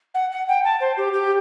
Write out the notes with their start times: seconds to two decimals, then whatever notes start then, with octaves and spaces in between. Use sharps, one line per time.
0.14 F#5
0.32 F#5
0.48 G5
0.64 A5
0.80 C5
0.97 G4
1.13 G4